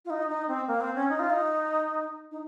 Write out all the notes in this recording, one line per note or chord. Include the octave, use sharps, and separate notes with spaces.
F4
D#4
D#4
C4
A#3
C4
C#4
D#4
F4
D#4
D#4